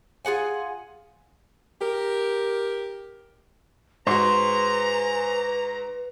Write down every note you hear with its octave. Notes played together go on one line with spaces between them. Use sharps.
F4 G#4 F#5 G#5
G4 A#4
G#2 F#4 G#4 B4 C5 A#5